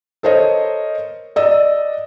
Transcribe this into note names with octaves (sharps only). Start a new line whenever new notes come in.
A4 A#4 C5 C#5 D#5
D5 D#5 E6